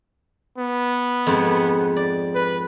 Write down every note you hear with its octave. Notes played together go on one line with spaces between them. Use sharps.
B3
F2 G#2
D5
B4